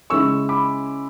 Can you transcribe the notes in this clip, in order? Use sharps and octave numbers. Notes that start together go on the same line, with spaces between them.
C#3 G#3 C#4 E4 C#6 E6
B5 D6